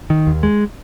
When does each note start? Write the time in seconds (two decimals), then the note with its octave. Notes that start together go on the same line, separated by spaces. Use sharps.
0.10 D#3
0.27 D#2
0.43 G#3